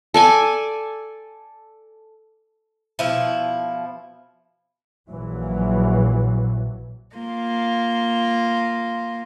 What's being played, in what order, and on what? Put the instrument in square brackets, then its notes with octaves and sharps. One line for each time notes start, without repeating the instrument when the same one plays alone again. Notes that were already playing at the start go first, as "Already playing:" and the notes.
[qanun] A4 D5 G#5
[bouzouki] B2 F3 E4
[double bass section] A#1 A#2 E3 F#3
[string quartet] A#3 F4